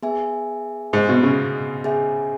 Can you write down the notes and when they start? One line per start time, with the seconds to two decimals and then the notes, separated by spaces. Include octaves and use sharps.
0.03 B3 G#4 E5 G#5
0.93 G#2
1.09 B2
1.23 C#3
1.84 C#4 G#4 E5 G#5